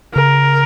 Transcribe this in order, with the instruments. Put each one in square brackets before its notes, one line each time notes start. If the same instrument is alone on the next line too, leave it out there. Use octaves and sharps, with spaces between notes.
[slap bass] C#3 [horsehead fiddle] A#4